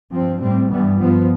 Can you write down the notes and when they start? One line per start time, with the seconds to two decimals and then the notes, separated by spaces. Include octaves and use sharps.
0.13 G2 F3 C4
0.41 A2 G3 C4
0.70 G2 E3 G3 B3
0.99 G2 F3 B3